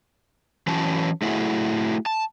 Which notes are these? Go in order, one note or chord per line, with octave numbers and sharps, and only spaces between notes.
E3 F#3 C#4 A5
A3 E4 F#4 G#4
A5